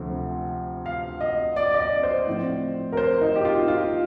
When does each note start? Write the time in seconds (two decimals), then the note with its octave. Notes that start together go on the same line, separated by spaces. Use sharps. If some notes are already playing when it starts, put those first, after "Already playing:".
Already playing: D2 C3 F3 A3 C4
0.86 F5
1.21 D#5
1.56 D5
1.74 D#5
1.80 D5
2.03 C5
2.27 A2 F3 C4
2.92 A#4
2.97 C5
3.21 D#4
3.35 G4
3.45 F4
3.68 F4